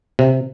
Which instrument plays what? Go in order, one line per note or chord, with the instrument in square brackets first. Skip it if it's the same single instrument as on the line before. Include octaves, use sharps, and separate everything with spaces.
[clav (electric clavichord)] C3